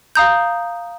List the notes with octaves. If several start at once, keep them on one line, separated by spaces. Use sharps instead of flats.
F5 A#5 D#6 G6